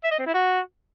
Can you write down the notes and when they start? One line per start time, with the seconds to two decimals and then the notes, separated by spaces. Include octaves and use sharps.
0.04 E5
0.11 D#5
0.19 C4
0.26 E4
0.34 F#4